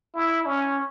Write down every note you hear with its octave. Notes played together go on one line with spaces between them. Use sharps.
E4
C#4